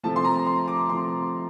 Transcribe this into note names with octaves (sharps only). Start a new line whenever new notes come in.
C3 F3 A3 C4 A5
C6
A#5
C6
D6
C3 F3 A3 C4 C6